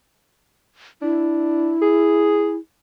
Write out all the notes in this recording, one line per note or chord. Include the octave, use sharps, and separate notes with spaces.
D4 E4
G#4